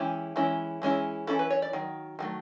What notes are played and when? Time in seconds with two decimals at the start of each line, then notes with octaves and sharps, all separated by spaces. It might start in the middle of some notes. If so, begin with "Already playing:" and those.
Already playing: E3 G#3 C#4 E4 G4
0.36 E3 G#3 C#4 E4
0.82 E3 G#3 C#4 E4
1.27 E3 G#3 C#4 E4 A4
1.39 B4
1.50 C#5
1.62 D5
1.73 D#3 F#3
2.19 D#3 F#3 A3